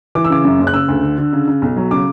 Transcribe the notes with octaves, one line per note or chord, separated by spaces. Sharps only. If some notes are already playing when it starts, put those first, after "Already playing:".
E3 D6
E6
C#3 D6
F#2
F#1
F#6
C#3 E6
D2
D3
D3
C#3
C#3
B1
F#3
C#3 D6